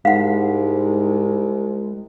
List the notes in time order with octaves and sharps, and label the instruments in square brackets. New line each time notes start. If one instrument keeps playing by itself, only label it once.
[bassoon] C2 [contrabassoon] G#2 [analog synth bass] G#3 [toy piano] F5 F#5